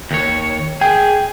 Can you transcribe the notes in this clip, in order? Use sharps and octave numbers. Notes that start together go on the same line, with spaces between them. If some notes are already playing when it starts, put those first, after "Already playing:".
D#2 C#5
G#4 G5